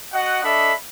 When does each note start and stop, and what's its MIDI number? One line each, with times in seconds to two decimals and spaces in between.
0.13 0.43 66
0.13 0.43 75
0.13 0.43 78
0.44 0.73 62
0.44 0.73 69
0.44 0.73 75
0.44 0.73 76
0.44 0.73 83